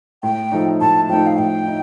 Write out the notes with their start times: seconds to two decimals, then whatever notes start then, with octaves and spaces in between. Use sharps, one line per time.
0.23 A2 G5
0.52 F3 A3 D#4
0.81 A2 A5
1.09 F3 A3 D#4 G5
1.27 F5
1.38 A2 G5
1.67 D#4